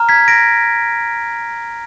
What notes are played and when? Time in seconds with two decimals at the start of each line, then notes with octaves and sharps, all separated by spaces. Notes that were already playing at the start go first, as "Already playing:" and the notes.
Already playing: A#5 F6
0.09 G#6 B6
0.28 A#6 D7